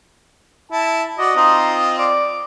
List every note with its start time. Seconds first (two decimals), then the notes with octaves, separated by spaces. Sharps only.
0.72 E4 A5
1.18 F#4 D5 D#5
1.36 C4 D#4 F4
1.98 D5 D6